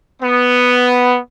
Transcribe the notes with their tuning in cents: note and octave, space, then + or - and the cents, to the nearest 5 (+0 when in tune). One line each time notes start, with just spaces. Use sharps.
B3 +5